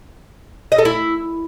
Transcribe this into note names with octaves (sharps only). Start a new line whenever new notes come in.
D#5
A4
E4